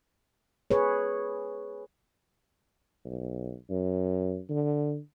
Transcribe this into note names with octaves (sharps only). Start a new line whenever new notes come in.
G#4 B4 C#5
B1
F#2
D3